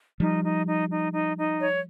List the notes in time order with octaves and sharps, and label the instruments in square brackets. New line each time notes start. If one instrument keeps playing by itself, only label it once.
[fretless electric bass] F3 G3 [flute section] D#4
[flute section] D#4
D#4
D#4
D#4
D#4
C#5